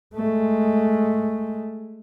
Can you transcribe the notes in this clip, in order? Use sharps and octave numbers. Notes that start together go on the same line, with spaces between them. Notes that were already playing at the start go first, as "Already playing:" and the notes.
G#3 A3